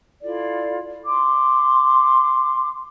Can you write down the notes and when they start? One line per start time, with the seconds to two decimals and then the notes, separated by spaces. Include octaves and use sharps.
0.22 E4 F4 A4 D5
1.04 C6 D6